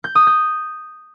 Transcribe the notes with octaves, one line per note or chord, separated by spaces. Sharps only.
G6
D#6
G6